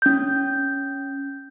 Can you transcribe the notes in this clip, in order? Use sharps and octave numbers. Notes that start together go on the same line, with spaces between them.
C#4 G6